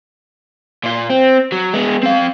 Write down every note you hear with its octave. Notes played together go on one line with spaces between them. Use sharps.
A#2 F4
C4
F#3
G#3 B3
C4 F5